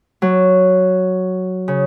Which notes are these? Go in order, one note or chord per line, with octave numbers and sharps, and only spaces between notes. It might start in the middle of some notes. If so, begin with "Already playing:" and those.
F#3
C#3